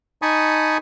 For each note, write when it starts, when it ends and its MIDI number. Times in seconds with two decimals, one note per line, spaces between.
0.22 0.78 63
0.22 0.78 80
0.22 0.78 81
0.22 0.78 83
0.22 0.78 85
0.22 0.78 87